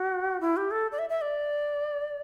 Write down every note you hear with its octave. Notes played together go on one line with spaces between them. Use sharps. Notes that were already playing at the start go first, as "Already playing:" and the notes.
Already playing: F#4
E4
G4
A4
D5
E5
E5
D5